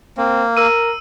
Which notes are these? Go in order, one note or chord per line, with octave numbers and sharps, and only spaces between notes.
A#3 C4
A#4 E6 D#7